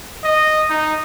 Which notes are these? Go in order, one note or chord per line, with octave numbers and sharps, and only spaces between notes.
D#5
D#4